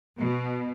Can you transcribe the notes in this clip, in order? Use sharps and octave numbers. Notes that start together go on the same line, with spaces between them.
B2